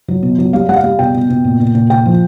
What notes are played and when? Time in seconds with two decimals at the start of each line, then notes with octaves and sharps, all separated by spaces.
0.08 F#3
0.23 B2
0.38 F#3
0.53 G3 F5
0.69 G3 F#5
0.76 F5
0.84 G3
0.99 B2 G5
1.15 B2
1.30 B2
1.44 A#2
1.60 A#2
1.75 A#2
1.90 A#2 G5
2.06 F3